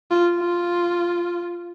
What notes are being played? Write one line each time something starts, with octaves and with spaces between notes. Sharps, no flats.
F4
F4